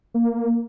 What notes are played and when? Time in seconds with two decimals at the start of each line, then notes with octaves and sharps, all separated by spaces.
0.14 A#3